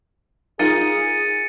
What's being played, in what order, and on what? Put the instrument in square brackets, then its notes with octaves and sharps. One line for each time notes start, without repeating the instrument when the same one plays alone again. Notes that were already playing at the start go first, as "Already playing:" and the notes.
[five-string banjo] D#4 F4 A#4 [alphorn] G#4 [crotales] A6 C#7 D#7